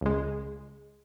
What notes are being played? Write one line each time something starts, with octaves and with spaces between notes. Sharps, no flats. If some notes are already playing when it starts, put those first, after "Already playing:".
C#2 G#3